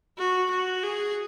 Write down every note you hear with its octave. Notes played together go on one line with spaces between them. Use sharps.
F#4
F#4
G#4